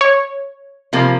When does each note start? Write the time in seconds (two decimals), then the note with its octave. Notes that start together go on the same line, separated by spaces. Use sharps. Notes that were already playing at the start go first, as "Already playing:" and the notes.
0.01 C#5
0.93 C3 F3 A#3